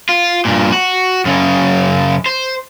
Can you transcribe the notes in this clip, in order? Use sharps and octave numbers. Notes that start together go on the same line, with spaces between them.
F4
G2 A#2
F#4
F#2 C#3
C5